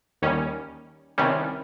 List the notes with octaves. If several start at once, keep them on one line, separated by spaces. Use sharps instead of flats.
D#2 D#3 G3 C#4
C2 C3 D#3 G3 C#4